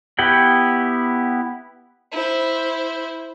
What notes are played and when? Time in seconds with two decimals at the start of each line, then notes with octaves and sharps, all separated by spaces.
0.19 B3 E4 G4 F#5 G5
2.12 E4 C5